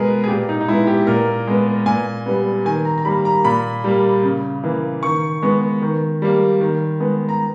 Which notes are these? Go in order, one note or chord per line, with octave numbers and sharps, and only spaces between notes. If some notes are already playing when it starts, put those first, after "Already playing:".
Already playing: B2 G#3 B3 G#4 A#4 B4
G#4
A#2 G4
D#4
D#4
G#3 B3 E4
G4
A#2 A#4
G#3 B3
A#2 G#5
G3 B3
D#3 G#5
A#5
A#5
G3 A#3 B5
A#5
A#2 B5
G3 A#3
C#3
E3 A#3
D#3 C#6
G#3 B3
D#3
G3 A#3
D#3
G#3 B3
A#5